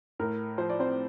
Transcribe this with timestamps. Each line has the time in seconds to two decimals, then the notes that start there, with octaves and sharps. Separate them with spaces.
0.19 A2 A#4
0.58 F3 C5
0.70 D5
0.80 C4 C5